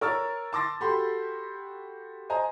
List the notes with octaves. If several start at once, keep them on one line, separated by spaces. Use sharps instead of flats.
A#4 C#5 C#6 E6 F6 A6
A5 C6 D6 E6 A6 A#6
F#4 G4 A4 B5 C6
C5 D#5 G#5 A#5